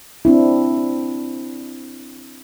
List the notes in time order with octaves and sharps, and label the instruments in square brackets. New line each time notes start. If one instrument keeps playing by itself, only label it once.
[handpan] C4 D4 E4